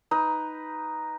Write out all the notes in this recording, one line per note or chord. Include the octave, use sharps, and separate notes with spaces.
D#4 B4